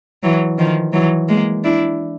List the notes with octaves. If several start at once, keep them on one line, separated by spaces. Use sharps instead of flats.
E3 F#3
D#3 F3
E3 F#3
G#3 A#3
D4 E4